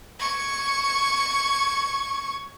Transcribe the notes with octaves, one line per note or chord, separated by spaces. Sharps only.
C#6 G#6